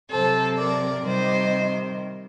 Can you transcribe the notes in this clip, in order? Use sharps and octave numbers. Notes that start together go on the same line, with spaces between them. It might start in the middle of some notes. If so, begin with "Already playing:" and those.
C3 F#3 A4 C5
A#4 D5
C3 D#3 G3 C5 D#5